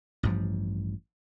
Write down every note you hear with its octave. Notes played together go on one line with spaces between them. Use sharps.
A1 G2 F3